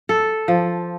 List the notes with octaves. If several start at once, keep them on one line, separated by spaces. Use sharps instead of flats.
A4
F3